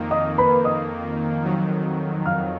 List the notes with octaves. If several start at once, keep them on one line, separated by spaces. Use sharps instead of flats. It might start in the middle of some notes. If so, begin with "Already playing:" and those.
Already playing: F2 D#3 A#3
D#5 D#6
B4 B5
D#5 D#6
F2 D#3 F#3
F5 F6